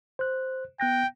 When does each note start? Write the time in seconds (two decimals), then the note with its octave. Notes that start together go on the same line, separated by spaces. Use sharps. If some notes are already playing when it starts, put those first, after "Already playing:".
0.19 C5 F#6
0.80 B3 G5 F#6 A#6